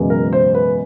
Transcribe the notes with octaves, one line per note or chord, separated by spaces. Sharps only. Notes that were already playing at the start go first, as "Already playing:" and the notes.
Already playing: F#1 E2 B2 G#3
A#4
C5
B4